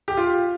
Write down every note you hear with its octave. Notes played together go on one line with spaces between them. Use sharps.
G4
F4